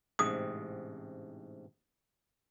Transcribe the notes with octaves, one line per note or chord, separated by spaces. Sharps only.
A1 G#2 C3 D#6